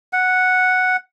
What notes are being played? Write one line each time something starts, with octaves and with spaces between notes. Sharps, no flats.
F#5